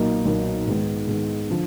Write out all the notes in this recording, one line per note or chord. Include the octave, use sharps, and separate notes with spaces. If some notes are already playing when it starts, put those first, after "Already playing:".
Already playing: B1 A#2 F#3 A#3 D#4
B1 A#2 F#3 A#3 D#4
G#2 D#3 G#3 B3
G#2 D#3 G#3 B3
D3 F3